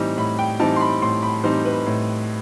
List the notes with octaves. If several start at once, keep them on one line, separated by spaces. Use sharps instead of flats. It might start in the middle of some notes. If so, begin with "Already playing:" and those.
Already playing: A2 E3 G3 C4 D#4
A2 B5
G5
E3 G3 C4 D#4 A5
C6
B5
A2 C6
B5
E3 G3 C4 D#4 C5
B4
A2